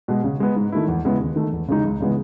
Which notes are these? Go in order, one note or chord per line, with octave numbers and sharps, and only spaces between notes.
B2 G#3
C#3
G#3 B3
G#2
D#3 A3 E4
E2
C#3 G#3 B3 E4
D#2
D#3 A3
E2
C#3 G#3 D#4
C#2
C#3 E3 G#3 B3